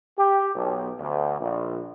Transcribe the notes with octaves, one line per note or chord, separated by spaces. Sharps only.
G4
B1
D2
A#1